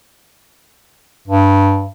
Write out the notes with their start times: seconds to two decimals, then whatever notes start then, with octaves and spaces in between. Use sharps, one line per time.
1.28 G2